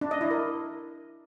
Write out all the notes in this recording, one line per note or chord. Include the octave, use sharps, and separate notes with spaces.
D4
D#5
E4
A#4